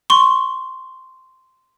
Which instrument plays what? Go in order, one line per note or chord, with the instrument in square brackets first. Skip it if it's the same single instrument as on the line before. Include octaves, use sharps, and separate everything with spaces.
[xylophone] C6 C#6